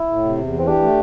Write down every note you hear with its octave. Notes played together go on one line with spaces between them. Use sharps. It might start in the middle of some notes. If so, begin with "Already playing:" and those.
Already playing: E4
A2
C3
E2
E3
C4
D4 G4
A3